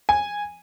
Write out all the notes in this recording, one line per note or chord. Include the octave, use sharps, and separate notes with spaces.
G#5